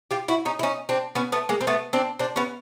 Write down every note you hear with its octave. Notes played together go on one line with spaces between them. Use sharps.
F4 G4
E4 F#4
C#4 D#4
E4
C#4 D#4
C4 D4
B3 C#4
A3 B3
G#3 A#3
C4
A3 B3
C4 D4
C4 D4
B3 C#4